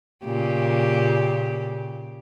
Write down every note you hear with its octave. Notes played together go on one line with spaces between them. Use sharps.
A#2 C#3 G4